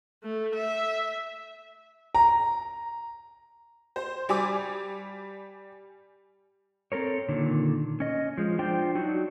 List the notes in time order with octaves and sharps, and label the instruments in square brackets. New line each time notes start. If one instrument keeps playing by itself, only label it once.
[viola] A3
E5
[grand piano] A#5
[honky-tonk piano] C5
G3 G#5 D6
[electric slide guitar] C4 A4 A#4 C#5
A#2 D3 D#3
C#4 D#5
F3 G#3
D4 F4 C5 G5
F#3 D4 D#4 F#4